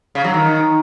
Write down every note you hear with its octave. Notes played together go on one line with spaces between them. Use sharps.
C#3
F#3
D#3